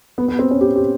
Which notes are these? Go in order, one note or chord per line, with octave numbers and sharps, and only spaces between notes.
B3
B3
C4
C#4
G4
G4